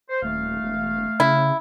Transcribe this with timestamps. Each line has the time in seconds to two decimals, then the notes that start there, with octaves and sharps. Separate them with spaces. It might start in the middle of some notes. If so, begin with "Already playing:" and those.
0.09 C5
0.22 D#1 A3 F5
0.62 E1
1.20 C#3 E4